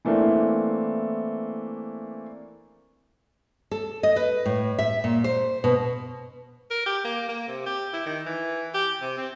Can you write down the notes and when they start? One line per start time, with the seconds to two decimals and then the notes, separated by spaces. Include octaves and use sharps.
0.05 E3 A3 A#3 C4 D4 E4
3.71 A4
4.03 D#5
4.16 B4
4.46 A2
4.79 E5
5.04 A#2
5.24 C5
5.64 B2
6.70 A#4
6.86 G4
7.04 A#3
7.28 A#3
7.48 C3
7.66 G4
7.93 E4
8.06 D#3
8.26 E3
8.74 G4
9.01 C3
9.18 C4